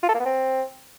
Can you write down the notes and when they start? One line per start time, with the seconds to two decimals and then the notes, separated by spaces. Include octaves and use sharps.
0.03 F4
0.09 A4
0.14 A#3
0.20 B3
0.26 C4